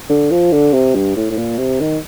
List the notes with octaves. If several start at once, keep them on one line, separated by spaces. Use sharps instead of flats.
D3
F3
D3
C3
G2
A2
A2
A#2
C3
D#3